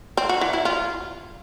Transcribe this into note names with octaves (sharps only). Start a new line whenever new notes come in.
C4
F#4
E3
E4
F4